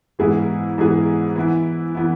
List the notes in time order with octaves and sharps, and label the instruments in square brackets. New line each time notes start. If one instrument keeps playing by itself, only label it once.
[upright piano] G#2 E3 B3 E4 G#4
G#2 E3 B3 E4 G#4
E3 B3 E4
E3 B3 E4